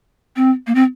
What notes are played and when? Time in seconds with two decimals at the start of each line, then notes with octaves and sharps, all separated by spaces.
0.36 C4
0.67 A#3
0.75 C4